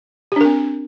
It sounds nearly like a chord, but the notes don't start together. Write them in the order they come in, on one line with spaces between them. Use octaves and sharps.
G4 D4 A#4 C4